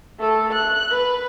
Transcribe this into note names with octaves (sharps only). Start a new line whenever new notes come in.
A3 A4
F#6
B4